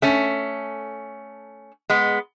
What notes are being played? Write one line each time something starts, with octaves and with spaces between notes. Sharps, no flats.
A3 C#4
G#3 B3